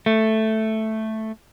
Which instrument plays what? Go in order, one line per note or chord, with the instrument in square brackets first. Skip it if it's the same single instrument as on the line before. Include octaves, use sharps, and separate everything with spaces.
[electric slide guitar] A3